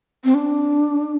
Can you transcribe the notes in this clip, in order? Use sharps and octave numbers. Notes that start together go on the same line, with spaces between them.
C4
D4